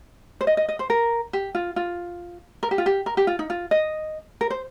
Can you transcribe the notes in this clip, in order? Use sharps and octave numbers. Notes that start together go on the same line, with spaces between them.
C5
D#5
D#5
D#5
C5
A#4
G4
F4
F4
A#4
G4
F4
G4
A#4
G4
F4
D#4
F4
D#5
A#4
C5